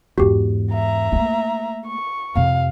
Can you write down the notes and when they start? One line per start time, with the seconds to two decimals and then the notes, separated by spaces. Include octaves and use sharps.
0.18 E2 G#2 F#4 G4
0.72 E5 A#5
1.12 A3 A#3
1.86 C#6
2.36 F2 C3 F5